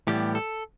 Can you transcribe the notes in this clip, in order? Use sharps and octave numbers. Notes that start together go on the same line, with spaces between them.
A2 E3 G3 B3 G4
A4